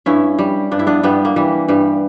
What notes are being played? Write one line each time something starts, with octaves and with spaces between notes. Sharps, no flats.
G2 C#4 E4
G3
G2 D4
E4
B3 D4
G2 G3 B3
A#3
E3 G3
G2 G3